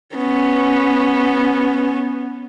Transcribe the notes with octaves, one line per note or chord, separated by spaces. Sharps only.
B3 C#4